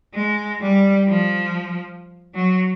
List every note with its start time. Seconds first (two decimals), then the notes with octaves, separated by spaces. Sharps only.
0.14 G#3
0.62 G3
1.09 F3
2.35 F#3